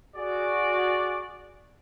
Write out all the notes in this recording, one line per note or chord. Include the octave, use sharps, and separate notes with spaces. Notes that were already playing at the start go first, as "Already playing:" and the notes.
F#4 G#4 D5